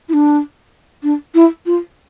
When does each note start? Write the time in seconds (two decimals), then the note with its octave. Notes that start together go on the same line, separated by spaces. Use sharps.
0.09 E4
0.13 D4
1.03 D4
1.34 E4
1.66 F4